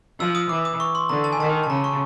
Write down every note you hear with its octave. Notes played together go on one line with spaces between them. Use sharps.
F3 E6
D#6
E3 D6
D#6
C#6
C6
D3 A#5
A5
G#5
D#3 A5
A5
C#3 A#5
C#6